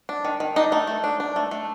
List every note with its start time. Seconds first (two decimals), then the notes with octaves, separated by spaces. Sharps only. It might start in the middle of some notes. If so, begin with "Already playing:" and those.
0.09 D4
0.25 D#3
0.40 D#3
0.56 D4 D#4
0.72 A3 D#4
0.87 A3
1.04 D4
1.20 D4
1.36 A3
1.51 A3